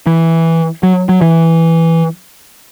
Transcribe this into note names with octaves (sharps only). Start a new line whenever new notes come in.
E3
F#3
F#3
E3